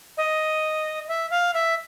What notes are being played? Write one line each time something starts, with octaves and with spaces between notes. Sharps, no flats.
D#5
E5
F5
E5